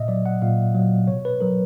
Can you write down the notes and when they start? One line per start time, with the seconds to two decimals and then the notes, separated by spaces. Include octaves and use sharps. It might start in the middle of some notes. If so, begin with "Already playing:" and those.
Already playing: A#2 D#5 E5
0.08 F#3 D5
0.26 F#5
0.42 A#2 F5
0.75 F#3
1.08 B2 C#5
1.25 B4
1.40 F#3 A#4